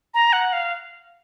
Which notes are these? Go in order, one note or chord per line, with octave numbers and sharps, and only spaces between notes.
A#5
F#5
F5